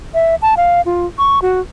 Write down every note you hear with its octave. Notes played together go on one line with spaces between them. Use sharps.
E5
A5
F5
F4
C#6
F#4